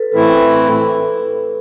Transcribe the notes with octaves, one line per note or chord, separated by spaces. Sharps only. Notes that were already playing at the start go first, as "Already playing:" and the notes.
Already playing: A4 B4
A2 E3 A3 C4 E4 B4